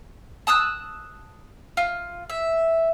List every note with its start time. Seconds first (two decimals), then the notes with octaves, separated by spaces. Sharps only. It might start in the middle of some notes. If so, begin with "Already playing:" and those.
0.47 A5 D#6 E6 F#6
1.77 F4
2.30 E5